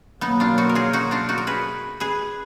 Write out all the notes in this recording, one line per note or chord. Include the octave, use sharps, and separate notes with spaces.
B2 F#3 A#3 B3 D#4
D4 F4
D#4 F#4
A#4
F4 G#4
D#4 F#4
D4 F4
D#4 F#4
A#4
G#4 B4
G#4 B4